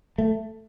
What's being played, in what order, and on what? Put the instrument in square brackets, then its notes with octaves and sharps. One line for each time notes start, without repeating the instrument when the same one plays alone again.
[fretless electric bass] A3